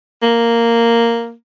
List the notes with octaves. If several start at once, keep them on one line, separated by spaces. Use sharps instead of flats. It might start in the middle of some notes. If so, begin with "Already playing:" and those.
A#3